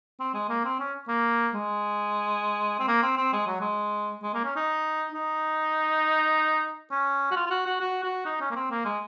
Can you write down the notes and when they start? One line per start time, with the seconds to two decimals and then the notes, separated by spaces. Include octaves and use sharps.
0.20 C4
0.34 G#3
0.49 A#3
0.65 C4
0.80 C#4
1.08 A#3
1.54 G#3
2.80 C4
2.88 A#3
3.03 C4
3.17 C4
3.33 G#3
3.47 F#3
3.61 G#3
4.23 G#3
4.34 A#3
4.45 C#4
4.56 D#4
5.12 D#4
6.91 C#4
7.31 F#4
7.36 F4
7.46 F4
7.51 F#4
7.66 F#4
7.80 F#4
8.04 F#4
8.26 D#4
8.41 C#4
8.51 A#3
8.56 C4
8.71 A#3
8.85 G#3